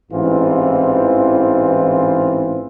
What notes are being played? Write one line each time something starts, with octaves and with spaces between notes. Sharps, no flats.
A1 G#2 E3 C4 F4